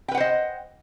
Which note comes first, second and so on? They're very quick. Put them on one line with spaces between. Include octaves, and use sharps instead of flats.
G5 B4 F#5 C5 D#5